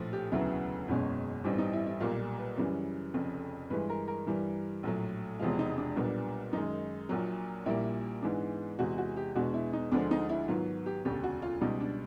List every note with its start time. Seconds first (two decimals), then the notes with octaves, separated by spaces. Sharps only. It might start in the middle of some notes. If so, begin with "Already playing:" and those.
Already playing: A#1 A2 F3
0.13 G4
0.32 E1 D2 C#3 F#3 B3 E4
0.88 F#1 E2 B2 G#3 C#4
1.44 A1 G2 E3 G3 C4 D4
1.58 D#4
1.73 E4
1.86 E4
2.00 B1 A#2 G3 A#3 F4
2.38 B4
2.57 F#2 C#3 E3 G3
3.14 F1 F2 C#3
3.70 G2 E3 G#3 B4
3.89 A#4
4.08 A#4
4.27 G2 E3 G3
4.83 A#1 A2 F#3
5.39 E1 E2 C3 F3 G#3 F4
5.59 D#4
5.78 D4
5.96 B1 A#2 G3 B3 D4
6.53 F#2 D#3 G#3 D#4
7.09 A#1 A#2 F#3
7.66 A#1 A#2 G3 A#3 E4
8.22 G#2 E3 G#3 B3 D4
8.79 E2 C3 E3 G#3 F#4
8.98 F#4
9.16 G4
9.35 E2 B2 G#3 B3 D4 F#4
9.54 E4
9.73 D#4
9.92 D2 D3 F3 G#3 D4
10.11 D#4
10.29 E4
10.48 G#2 D#3 F#3 B3 F4
10.86 G4
11.05 E1 D2 C#3 G4
11.23 F#4
11.42 F4
11.61 C#2 B2 G3 D#4
11.80 D4